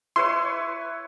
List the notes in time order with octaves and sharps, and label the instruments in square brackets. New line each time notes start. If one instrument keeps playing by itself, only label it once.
[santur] E4 B4 C#5 [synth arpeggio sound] C6